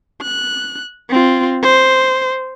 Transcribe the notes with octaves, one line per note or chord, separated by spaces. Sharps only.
F#6
C4 F4
C5